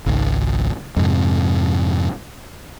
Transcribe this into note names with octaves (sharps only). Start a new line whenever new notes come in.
G#1 C#2
F2 G#2 C3